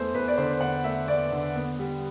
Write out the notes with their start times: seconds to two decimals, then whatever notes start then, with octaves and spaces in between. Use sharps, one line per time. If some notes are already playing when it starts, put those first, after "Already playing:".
Already playing: E2 A3 C5
0.14 E2 B4
0.28 D5
0.37 D3 C5
0.61 E2 F#5
0.84 A3 E5
1.08 E2 D5
1.32 D3
1.56 B3
1.79 G3